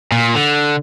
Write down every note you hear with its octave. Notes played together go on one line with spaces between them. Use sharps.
A#2
D3